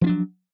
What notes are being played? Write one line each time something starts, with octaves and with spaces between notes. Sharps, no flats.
F3 F#3 C#4 D4